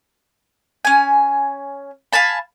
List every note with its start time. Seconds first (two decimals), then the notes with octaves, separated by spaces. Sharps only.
0.85 C#4 G#5
2.13 F5 G#5 A5 B5